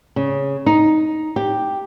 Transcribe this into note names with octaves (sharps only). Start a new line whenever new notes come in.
C#3
D#4
G4